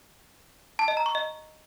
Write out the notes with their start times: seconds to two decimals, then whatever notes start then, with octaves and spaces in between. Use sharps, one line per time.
0.79 A5
0.88 D#5
0.97 A#5
1.06 C#6
1.15 D#5